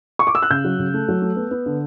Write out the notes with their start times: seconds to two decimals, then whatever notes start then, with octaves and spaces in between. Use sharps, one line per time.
0.19 C#6
0.27 D6
0.35 E6
0.42 F#6
0.50 C#3 G6
0.65 F#3
0.79 C#3
0.94 A3
1.08 F#3
1.22 A3
1.36 B3
1.51 B3
1.66 D3